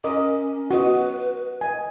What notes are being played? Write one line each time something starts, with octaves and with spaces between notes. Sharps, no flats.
C#4 A#4 D#5 D6
F#4 B4 D#5
D#5 G#5